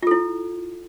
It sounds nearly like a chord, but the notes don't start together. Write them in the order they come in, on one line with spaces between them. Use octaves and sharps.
F4 A4 E4